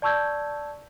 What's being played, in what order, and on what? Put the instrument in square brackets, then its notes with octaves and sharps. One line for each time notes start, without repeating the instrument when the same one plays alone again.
[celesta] D5 A5 C#6 E6 G6 G#6